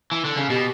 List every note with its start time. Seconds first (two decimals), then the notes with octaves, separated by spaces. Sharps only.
0.12 E3
0.25 D3
0.37 C#3
0.49 B2 G4